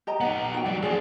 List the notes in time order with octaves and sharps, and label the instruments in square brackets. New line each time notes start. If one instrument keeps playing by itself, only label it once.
[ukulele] G4 D#5 A#5
[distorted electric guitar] B3 D#4 [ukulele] F#5
[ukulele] F#4 G5
[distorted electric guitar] F#3 G3 [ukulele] D5
[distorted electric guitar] A#3 D4 [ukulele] G#4 C5 D5